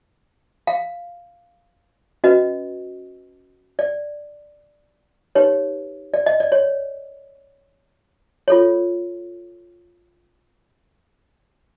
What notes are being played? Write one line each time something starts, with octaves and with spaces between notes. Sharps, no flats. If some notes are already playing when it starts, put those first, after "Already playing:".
F5
C#4 F#4 B4 D#5
D5
D#4 G4 B4 C#5
D5
D#5
D5
C#5
F4 A4 C#5